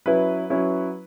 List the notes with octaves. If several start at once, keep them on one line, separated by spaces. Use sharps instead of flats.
F#3 C#4 E4 B4
F#3 C#4 E4